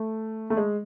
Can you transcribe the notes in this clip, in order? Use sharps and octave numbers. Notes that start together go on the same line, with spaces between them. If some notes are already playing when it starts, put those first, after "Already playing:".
Already playing: A3
A3
G#3